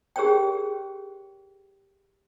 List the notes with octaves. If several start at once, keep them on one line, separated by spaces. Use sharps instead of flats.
G4 G#4 A#4 C5 C#5 G5